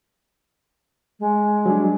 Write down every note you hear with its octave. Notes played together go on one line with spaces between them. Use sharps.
G#3
F#3 G3 D4